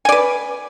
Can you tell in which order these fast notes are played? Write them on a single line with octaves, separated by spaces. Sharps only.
G#5 D5 B4